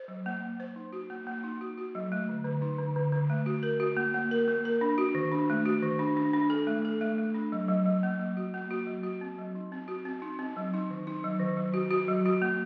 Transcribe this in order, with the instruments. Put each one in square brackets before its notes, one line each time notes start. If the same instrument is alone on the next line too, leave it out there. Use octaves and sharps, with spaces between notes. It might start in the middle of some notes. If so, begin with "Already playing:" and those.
Already playing: [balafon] C5
F#3
A#3
A#3
C5
D#4
F#4
A#3
A#3
D#4
F#4
F#4
F#3
A3
D3
D3
D#4
D3
D3
D3
A3
F#4
A#4
F#4
A#3
A#3
A#4
A#3
A#4
D4
F#4
D#3
D4
A3
F#4
D#3
D4
D4
D4
A4
A3
A4
A3
A3
D4
F#3
F#3
F#3
A#3
F#3
F#4
A#3
F#4
F#3
F#4
C4
F#3
D#4
C4
F#4
C4
D#4
C4
F#3
D#4
D#3
D#4
F#3
D#3
F#3
F#4
F#4
F#3
F#4
A#3